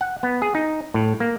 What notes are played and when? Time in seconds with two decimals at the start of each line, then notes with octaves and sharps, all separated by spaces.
0.01 F#5
0.23 B3
0.42 G#4
0.55 D#4
0.94 A2
1.20 A#3